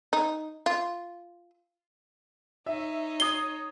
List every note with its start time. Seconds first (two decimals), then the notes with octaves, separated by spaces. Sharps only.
0.13 D#4
0.66 F4
2.66 D#4 C#5 E5
3.20 D#6 G#6 C7 G7